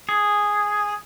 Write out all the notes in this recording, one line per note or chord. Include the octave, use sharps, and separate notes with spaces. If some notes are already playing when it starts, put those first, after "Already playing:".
G#4